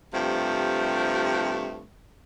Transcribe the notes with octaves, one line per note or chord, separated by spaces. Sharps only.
G2 C3 F3 A3